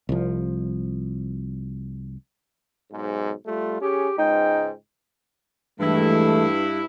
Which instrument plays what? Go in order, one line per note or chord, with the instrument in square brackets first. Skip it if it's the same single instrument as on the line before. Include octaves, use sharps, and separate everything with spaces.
[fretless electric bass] C2 F3
[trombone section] B1 G#2
G3 A3 F4
[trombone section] C#4 G#4 [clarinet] G4
[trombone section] C#2 G#2 [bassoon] D#4 [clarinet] G5
[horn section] G2 E4 [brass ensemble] E3 G#3 A3